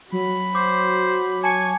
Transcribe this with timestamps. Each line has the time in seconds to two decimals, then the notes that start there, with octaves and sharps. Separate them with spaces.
0.12 F#3 F#4 B5
0.55 C5 D6
1.44 G#5 A5 C#6 C#7